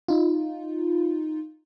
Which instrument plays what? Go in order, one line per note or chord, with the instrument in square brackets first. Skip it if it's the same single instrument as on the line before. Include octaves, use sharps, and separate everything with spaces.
[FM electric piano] D#4 F4